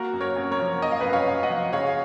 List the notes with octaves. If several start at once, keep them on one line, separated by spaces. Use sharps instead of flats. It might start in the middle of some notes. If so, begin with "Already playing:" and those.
Already playing: A#3 F#4 A#4
F#2
A#4 C#5
F#2
A#4 C#5
F3
A#3 D#5
F5
B4 D#5
F#2
C#5 F5
F#2
D#5 F#5
F3
C#3 C#5 F5